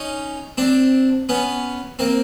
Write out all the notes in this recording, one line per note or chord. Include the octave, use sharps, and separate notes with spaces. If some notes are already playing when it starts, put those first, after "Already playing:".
Already playing: C#4 D#4
C4 D4
B3 C#4
A#3 C4